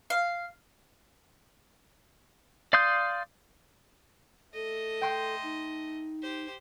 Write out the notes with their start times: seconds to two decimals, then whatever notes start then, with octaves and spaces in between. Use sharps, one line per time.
0.10 F5
2.73 D5 F5 C6 D#6 G6
4.54 A3 A4 D#5
5.02 G5 C6 G6
5.43 D#4
6.22 G4 C5